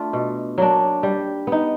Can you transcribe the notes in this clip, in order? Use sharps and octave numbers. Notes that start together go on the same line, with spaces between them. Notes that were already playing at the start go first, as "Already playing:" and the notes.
Already playing: A3 D4 F4
B2
F#3 A#3 D4
G3
B3 D#4